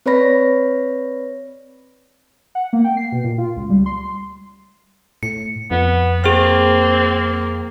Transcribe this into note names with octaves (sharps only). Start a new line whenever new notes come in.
C4 B4 C#5 D5 B5 A#6
F#5
A#3
G5
C7
B2
A#2
F4
C#2
G3
C6
A2 C#7
F2 B3
A#3 C4 G#4 F6